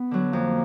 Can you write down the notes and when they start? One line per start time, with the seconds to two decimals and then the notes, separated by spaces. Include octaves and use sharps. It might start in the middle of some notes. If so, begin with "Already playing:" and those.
Already playing: B3
0.11 D3 F#3
0.33 F2 A#3